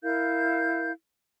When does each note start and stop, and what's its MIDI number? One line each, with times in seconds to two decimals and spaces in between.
0.03 0.91 64
0.03 0.91 70
0.03 0.91 77
0.03 0.91 91